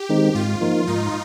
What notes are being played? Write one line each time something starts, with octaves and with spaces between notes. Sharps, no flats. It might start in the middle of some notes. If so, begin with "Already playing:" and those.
Already playing: G4
D#3 G#3 C4 D#4
G#2 F4
F3 A#3 D#4
G#2 D#4